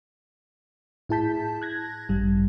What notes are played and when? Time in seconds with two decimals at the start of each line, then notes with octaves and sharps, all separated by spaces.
1.09 A2 E4 G#4 A5 G6 B6
1.62 F#6 G#6 A#6
2.09 A1 G2 G3